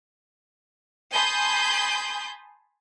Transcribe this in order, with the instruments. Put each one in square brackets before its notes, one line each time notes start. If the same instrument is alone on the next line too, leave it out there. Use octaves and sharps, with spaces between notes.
[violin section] G#5 A5 B5 C6 D#6 G6